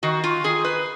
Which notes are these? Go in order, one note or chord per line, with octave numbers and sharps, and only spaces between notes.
D#3 F#4
F4
D#3 G#4
B4